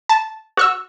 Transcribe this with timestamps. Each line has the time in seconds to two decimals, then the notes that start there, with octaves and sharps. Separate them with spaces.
0.09 A5
0.57 F#4 C#6 E6